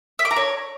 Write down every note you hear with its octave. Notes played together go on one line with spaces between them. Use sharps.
E5
D6
A#5
C#5